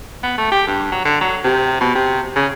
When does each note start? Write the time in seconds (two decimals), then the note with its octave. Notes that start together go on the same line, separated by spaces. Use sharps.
0.23 B3
0.38 A3
0.52 G4
0.67 G2
0.92 F#3
1.05 D3
1.21 F#3
1.44 C3
1.81 B2
1.95 C3
2.36 C#3